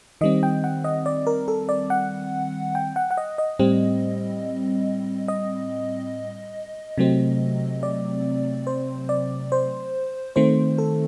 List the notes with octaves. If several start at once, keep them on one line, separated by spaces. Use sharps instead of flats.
D#3 G3 C4 D#5
G5
F#5
D#5
D5
A#4
A4
D5
F#5
G5
F#5
F#5
D#5
D#5
A2 G3 C4
D#5
C3 F#3 A3 C4
D5
C5
D5
C5
D#3 A3 C4 C5
A4